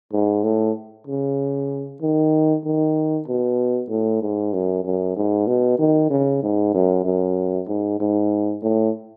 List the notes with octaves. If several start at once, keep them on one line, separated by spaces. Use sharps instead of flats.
G#2
A2
C#3
D#3
D#3
B2
A2
G#2
F#2
F#2
G#2
B2
D#3
C#3
G#2
F#2
F#2
G#2
G#2
A2